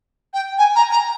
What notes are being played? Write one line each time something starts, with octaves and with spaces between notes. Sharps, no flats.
G5
G#5
A#5
A#5